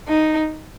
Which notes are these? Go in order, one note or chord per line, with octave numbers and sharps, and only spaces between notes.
D#4